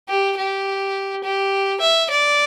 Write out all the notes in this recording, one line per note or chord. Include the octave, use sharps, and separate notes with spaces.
G4
G4
G4
E5
D5